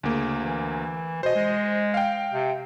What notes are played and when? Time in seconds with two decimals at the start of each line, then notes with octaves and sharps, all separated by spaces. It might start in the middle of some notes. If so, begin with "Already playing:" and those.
0.03 D2 C#3 A#3
0.40 E3
1.23 B2 C5 D#5
1.35 G#3
1.94 F5 G5
2.33 C3